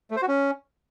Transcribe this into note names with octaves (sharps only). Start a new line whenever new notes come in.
A3
C5
F#4
C#4